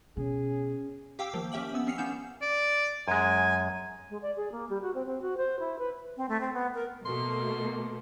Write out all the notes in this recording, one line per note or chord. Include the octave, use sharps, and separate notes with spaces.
B2 C#4 G#4
G4 F5 G5 D6 E6
D#3 F3 A#3
C#4 G4 E5 G5 F#7
B3 E6
C4 C#4 C7 C#7 F7
A#3 B3 C#4 E6 G6 E7
D5
F#2 G#3 G#5
G#3
D5
G#4
A#3
G3
F#4
C4
C4
F#4
C5
E4
B4
C4
A3
C4
B3
A#4
B2 A3 A#3 C6